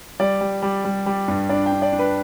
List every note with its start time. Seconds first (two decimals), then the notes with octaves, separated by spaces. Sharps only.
0.20 G3 D5
0.41 G3
0.62 G3
0.84 G3
1.06 G3
1.28 G2
1.49 D4 D5
1.66 G5
1.72 D4
1.82 D5
1.93 D4
1.99 B4